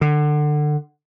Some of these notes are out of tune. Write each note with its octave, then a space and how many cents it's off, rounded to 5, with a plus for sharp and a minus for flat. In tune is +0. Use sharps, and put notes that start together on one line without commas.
D3 +25